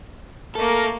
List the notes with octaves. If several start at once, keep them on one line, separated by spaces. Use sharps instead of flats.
A3 A#3 A4 A#4